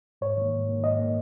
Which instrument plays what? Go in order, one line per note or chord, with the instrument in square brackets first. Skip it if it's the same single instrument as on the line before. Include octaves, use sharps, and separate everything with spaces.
[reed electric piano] G#2 C#5
D#3 A#3
G#2
D#3 A#3
G#2 D#5
D#3 A#3